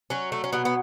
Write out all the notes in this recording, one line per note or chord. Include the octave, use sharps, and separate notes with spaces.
F#3 C#4
A3
C#4
B2 B3
B3